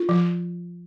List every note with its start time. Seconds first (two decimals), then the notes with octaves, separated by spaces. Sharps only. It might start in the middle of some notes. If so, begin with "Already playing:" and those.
Already playing: F4
0.09 F3